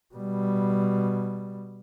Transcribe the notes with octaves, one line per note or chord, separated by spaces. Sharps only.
B2 G3